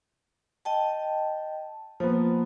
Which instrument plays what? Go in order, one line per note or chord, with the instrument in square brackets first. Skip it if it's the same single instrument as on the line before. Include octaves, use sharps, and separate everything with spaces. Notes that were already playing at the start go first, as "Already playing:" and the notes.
[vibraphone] D#5 G5 A5
[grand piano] F3 B3 [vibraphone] A#3